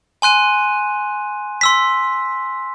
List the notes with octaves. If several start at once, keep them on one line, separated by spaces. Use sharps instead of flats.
G#5 C6 F#6 D#7
C6 E6 B6